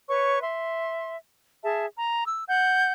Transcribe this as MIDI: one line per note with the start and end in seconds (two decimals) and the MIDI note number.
0.07 0.39 71
0.07 0.39 73
0.07 0.39 85
0.40 1.16 76
0.40 1.16 84
1.64 1.86 68
1.64 1.86 76
1.64 1.86 81
1.95 2.26 82
2.27 2.43 88
2.47 2.93 78
2.47 2.93 91